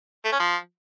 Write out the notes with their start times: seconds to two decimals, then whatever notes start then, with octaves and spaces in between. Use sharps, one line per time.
0.25 A3
0.32 C#4
0.40 F3